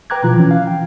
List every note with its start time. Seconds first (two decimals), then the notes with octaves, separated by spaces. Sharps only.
0.10 B4 G5 A#5 D6 F#6 G#6
0.23 B2 F3 F4
0.35 E3 C#4
0.51 F5
0.67 G5